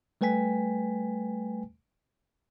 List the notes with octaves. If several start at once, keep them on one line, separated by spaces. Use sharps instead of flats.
G3 A3 B4 G5 G#5 B6